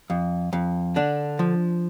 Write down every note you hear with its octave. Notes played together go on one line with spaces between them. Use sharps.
F2
F2
D3 D4
F3